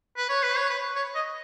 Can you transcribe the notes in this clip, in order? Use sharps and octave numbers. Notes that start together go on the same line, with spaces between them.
B4
C#5
B4
C#5
B4
C#5
D#5